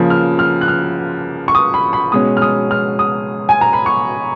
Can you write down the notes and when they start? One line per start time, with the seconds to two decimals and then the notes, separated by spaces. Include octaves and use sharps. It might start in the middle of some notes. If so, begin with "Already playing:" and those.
Already playing: C#3 F3 A#3
0.10 F6
0.39 F6
0.61 F#6
0.68 F6
1.48 C#6
1.55 D#6
1.74 B5
1.93 B5
2.12 B2 G#3 C#4 D#6
2.37 F6
2.42 D#6
2.71 F6
2.99 D#6
3.49 G#5
3.61 A#5
3.73 B5
3.86 C#6